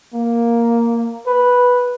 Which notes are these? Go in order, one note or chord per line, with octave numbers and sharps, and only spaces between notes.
A#3
B4